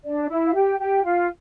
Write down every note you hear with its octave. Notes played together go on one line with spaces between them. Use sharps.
D4 D5
D5
E4 E5
F5
G4 G5
G4 G5
F4 F5